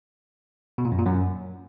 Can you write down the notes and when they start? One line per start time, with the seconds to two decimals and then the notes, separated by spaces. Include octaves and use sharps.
0.78 B2
0.85 A#2
0.92 F#2
0.99 A#2
1.06 F#2